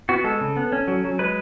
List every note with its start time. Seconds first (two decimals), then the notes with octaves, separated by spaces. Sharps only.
0.09 B3 F#4
0.24 G#3 A4
0.41 C#3
0.57 B3
0.72 C#4
0.88 F#3
1.04 F#3
1.19 G#3 B4